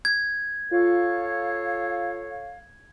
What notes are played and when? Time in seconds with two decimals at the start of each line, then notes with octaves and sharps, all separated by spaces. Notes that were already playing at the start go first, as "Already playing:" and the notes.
0.05 G#6
0.71 F4 A4 C#5 F5